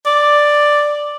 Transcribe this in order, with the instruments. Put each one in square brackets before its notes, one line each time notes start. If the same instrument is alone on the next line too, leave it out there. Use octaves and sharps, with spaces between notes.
[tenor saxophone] D5